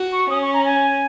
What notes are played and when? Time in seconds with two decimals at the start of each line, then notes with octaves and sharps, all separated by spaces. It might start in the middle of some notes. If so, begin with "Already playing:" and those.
Already playing: F#4
0.12 C#6
0.29 C#4 D#6
0.41 C#6
0.53 A#5
0.65 G#5